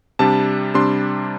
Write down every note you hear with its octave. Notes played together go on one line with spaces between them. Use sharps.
C3 G3 D4 A5
C3 G3 D4 C6